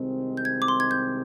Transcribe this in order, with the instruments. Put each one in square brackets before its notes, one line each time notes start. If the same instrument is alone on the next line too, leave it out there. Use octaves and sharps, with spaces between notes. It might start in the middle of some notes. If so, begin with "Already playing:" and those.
Already playing: [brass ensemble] C2 C3 D#3 G#3 C4
[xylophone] G6
G#6
D6
C6
G#6
G6